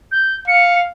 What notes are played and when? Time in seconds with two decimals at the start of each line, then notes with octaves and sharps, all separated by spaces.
0.12 G6
0.48 F5 C#7